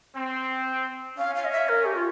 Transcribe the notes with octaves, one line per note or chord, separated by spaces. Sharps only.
C4
C#4 F5
F5
D#5
E5
A#4
G4
F4